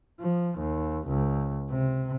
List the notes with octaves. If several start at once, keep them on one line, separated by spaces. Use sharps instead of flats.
F3
D#2
C#2
C3